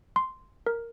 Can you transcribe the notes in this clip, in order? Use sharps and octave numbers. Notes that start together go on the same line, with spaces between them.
C6
A#4